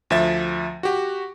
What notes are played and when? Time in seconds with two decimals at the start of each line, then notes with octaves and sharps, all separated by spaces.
0.10 D2 F3 E5 A6
0.83 F#4 G4